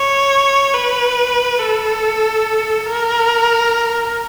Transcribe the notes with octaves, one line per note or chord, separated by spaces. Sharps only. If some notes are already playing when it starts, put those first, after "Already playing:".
Already playing: C#5
B4
A4
A#4